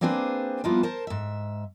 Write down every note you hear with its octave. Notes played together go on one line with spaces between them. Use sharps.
A#3 C4 D4 G#4 B4 C5
F3 G3 A#3 B3 E4 F4
A#4 C5 A5
G#2 E5